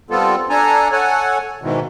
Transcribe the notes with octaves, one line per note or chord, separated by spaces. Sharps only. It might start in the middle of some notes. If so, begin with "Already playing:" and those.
G3 B3 C4 F4 A4
D4 A4 G#5 A#5
A4 C#5 F#5 G#5
G#2 B2 D#3 E3